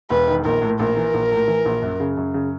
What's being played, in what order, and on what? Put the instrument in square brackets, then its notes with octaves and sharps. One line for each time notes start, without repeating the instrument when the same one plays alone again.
[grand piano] E1 [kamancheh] B4
[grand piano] D#3
[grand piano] A#1 [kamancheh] A#4
[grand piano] A2
[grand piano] A#1 [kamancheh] A#4
[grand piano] E3
A#1
A2
E3
A#1
F#2
C#3
F#2
C#3